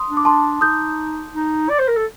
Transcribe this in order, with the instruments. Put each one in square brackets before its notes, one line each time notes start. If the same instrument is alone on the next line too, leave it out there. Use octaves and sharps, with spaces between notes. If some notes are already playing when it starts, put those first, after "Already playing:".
Already playing: [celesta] C6 D#6
[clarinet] D4
[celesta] D6
A5 C6
[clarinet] D#4 [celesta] D#6 G6
[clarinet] D#4
D5
C5
A#4
A4